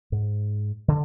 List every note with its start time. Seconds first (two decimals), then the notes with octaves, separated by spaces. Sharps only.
0.12 G#2
0.88 D3